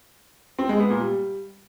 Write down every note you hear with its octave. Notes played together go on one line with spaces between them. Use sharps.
C4
G#3
B3
A#2
G3